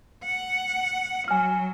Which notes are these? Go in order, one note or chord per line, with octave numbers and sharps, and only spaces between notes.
F#5
F#3 G#5 F6